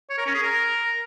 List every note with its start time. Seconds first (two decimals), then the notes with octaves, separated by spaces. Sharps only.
0.10 C#5
0.18 A#4
0.26 C#4
0.34 G#4
0.43 A#4